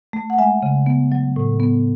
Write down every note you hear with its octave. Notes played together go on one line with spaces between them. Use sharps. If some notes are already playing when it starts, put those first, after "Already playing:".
A3
F#5
G#3 E5 G#5
C#3
B3
F#3
A2
B3